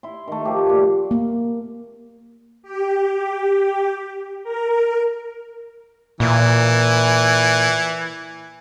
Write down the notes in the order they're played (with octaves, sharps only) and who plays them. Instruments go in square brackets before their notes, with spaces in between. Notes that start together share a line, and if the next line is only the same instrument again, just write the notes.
[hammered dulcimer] E4 C6
D#3 A3
F3 G4
A#2 D6
[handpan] A#3
[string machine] G4
A#4
[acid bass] A#2 [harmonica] E3